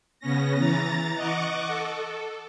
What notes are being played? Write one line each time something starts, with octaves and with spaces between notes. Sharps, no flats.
C#3 B3 C#4 A#6
E3 A#5 A6
D#5 F#5 C#6 D6
A4